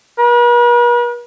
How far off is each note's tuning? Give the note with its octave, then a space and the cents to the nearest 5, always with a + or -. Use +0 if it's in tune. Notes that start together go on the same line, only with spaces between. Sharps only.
B4 -45